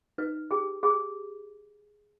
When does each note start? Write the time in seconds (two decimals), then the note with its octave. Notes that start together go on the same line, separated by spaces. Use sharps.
0.18 D#4 B4
0.51 G4 G#4
0.83 G4 G#4